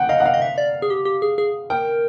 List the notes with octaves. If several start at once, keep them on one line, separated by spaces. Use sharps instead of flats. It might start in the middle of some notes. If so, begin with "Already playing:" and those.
Already playing: F#5 G5
D#5 F5
F#5
F5
D#5
E5
D5
G#4
G4
G4
G#4
G#4
A#4 G5